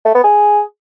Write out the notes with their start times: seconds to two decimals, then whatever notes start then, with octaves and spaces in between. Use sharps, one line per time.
0.05 A3
0.15 B3
0.24 G#4